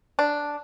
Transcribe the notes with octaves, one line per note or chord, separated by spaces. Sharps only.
D4